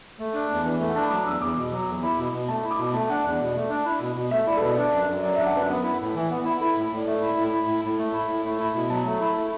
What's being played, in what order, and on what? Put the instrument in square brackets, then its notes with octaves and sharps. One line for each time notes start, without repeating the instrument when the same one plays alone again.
[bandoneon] A3
D4
E2
E3
A3
[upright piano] F#5
[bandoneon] D4 [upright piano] A5
[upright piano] B5
[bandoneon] F#3 [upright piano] D6
[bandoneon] E2 [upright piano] E6
[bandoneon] E2 [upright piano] D6
[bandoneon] B2
F#3
E2
E4
B2
B2
[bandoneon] A3 [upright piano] A5
[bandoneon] E4
[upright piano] D6
[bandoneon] B2
[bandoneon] A3 [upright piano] A5
[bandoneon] D4 [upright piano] F#5
[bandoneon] E2 [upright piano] D5
[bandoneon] B2
A3
D4
E4
B2
B2
[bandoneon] A3 [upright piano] E5
[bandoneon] E4 [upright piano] D5
[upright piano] A4
[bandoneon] B2 [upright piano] B4
[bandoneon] D4 [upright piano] D5
[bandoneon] F#2
F#2
[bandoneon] F#3 [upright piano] D5
[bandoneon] D4 [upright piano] E5
[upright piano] F#5
[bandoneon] F#2 [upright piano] B4
[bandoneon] B3
E4
A2
E3
B3
E4
[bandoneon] E4 [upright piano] A4
[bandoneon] A2
[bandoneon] A2 [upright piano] D5
[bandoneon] A3 [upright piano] E5
[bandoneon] E4
A2
E4
A2
A2
A3
E4
A2
A3
E4
B2
[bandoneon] F#3 [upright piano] A5
[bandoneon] A3
E4
A3